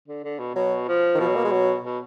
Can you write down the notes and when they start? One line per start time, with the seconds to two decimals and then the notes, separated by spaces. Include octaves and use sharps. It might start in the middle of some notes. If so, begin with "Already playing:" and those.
0.08 D3
0.24 D3
0.39 B2
0.55 B2 F#3
0.88 F3
1.15 D#3
1.20 B2 F3
1.28 F#3
1.36 A#3
1.44 G#3
1.52 F#3
1.84 B2